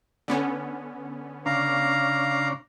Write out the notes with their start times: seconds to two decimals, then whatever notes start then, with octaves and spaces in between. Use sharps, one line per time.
0.28 D3 B3 C#4
1.46 C#3 D4 F5 A#5